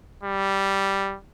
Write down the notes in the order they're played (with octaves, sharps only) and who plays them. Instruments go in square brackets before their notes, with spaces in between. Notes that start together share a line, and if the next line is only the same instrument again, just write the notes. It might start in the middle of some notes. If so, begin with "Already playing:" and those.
[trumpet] G3